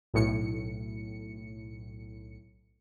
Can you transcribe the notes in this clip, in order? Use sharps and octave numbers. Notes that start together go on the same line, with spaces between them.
B1 A2 C#7